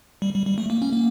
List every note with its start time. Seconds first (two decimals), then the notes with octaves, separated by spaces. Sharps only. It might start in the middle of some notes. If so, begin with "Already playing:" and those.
0.22 G3
0.35 G3
0.47 G3
0.58 A3
0.70 A#3
0.82 C#4
0.93 A#3